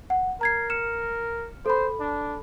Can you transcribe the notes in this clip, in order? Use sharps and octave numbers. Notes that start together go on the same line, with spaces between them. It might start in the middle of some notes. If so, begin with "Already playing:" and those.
F#5
A#4 A#5 G#6 C7
F6 C#7 E7
A4 C5 B5
D4